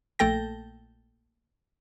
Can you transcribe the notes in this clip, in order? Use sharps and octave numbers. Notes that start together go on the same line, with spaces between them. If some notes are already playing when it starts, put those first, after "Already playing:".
A#1 A3 A4 G5 A#6